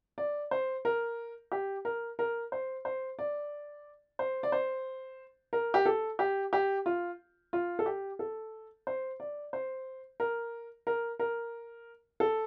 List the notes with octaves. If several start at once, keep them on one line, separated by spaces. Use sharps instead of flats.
D5
C5
A#4
G4
A#4
A#4
C5
C5
D5
C5
D5
C5
A#4
G4
A4
G4
G4
F4
F4
A4
G4
A4
C5
D5
C5
A#4
A#4
A#4
A4